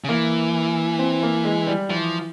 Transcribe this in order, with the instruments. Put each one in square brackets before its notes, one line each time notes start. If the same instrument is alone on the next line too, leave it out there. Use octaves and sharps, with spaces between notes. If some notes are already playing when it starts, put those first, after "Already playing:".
[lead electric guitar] C#3
[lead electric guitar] E3 [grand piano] A#3
[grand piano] C4
A#3
G#3
G3
[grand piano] E3 [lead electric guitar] F3